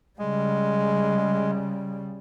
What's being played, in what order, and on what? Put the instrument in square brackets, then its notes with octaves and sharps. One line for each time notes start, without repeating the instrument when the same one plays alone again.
[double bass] C#3 G3 [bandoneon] G#3